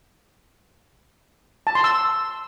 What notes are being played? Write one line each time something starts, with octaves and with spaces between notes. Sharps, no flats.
A5
C6
E6